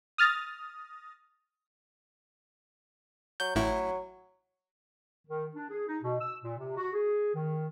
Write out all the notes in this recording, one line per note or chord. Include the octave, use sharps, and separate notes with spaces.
D#6 F6 A6 A#6
F#3 G6
A1 A2 F#3 E4
D#3
D4
G#4
D#4
B2
E6
A#2
C3
F#4
G#4
D#3